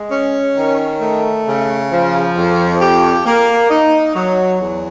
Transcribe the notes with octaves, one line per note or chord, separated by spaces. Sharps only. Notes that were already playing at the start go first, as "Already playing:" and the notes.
Already playing: G#3
C#4
D#3
A3
C#3
F3
F2
G4
A#3
D#4
F#3
E2